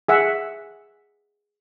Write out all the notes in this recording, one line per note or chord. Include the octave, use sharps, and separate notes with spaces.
G#4 E5 F#5